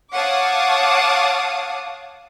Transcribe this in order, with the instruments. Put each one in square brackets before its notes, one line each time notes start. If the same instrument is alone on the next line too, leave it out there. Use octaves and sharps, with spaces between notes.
[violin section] C#5 F5 F#5 A5 D6 D#6